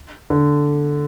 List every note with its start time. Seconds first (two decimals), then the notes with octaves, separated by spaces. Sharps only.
0.30 D3